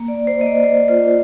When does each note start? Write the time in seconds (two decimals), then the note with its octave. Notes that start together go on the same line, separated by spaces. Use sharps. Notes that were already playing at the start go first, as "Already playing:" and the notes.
Already playing: A#3
0.08 D5
0.16 A#3
0.27 C5
0.39 A#3 D#5
0.46 D5
0.64 A#3 C5
0.88 F4 C5